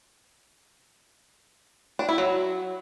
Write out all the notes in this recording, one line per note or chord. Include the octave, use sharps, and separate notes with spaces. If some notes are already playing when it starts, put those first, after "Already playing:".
D4
E4
F#3